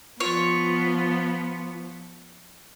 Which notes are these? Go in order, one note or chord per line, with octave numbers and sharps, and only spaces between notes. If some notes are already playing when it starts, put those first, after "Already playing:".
F3 B3 F4 C#5